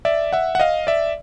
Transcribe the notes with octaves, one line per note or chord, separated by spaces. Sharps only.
D5 E5
E5 F#5
F#5
D#5 F5
D5 E5